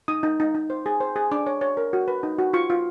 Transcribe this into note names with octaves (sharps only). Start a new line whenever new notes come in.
D#4 D#6
D#4
D#4
D#4
C5
G#4
C5
G#4
D4 D6
C#5
C#5
A#4
F#4
B4
D#4
F#4
F4 C#6
F4